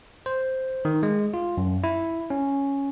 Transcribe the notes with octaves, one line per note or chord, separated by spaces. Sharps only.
C5
D#3
G#3
F4
F#2
E4
C#4